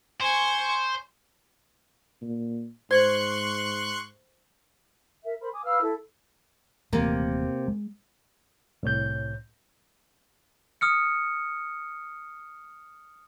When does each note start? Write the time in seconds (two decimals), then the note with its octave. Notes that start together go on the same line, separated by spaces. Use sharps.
0.21 C5 G#5 C#6
2.22 A#2
2.91 G#2 C5 C6 C#6 F#6 G#6
5.24 A#4 E5
5.41 A#4 C5 B5
5.53 G#5 D6 D#6
5.64 B4 F5 E6 F6
5.82 E4 A4
6.93 D#1 C3 E3 A3 A#3
7.68 G#3
8.83 C2 A2 C#5 G6
10.81 D#6 F6 C#7